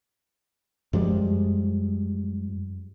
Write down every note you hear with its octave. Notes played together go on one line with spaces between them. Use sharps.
F#2 F3 G3 G#3